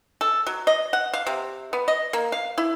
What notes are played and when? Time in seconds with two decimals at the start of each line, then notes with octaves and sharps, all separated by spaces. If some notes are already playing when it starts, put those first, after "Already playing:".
0.21 A4
0.47 F#3
0.67 D#5
0.93 F#5
1.13 F5
1.27 C3
1.73 B3
1.88 D#5
2.13 A#3
2.32 F5
2.58 E4